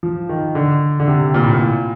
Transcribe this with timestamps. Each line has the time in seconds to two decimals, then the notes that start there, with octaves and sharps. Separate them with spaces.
0.03 F3
0.29 D#3
0.55 D3
1.00 D3
1.08 C3
1.34 A#2
1.43 A2
1.53 A#2